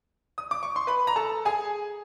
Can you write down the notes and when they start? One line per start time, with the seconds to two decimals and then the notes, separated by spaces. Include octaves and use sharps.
0.38 D#6
0.51 D6
0.63 C#6
0.76 C6
0.87 B4 B5
1.07 A#5
1.16 A4 A5
1.45 G#4 G#5